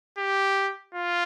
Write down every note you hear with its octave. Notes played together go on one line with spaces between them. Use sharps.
G4
F4